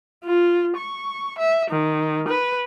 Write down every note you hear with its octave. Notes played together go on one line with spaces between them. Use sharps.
F4
C#6
E5
D#3
B4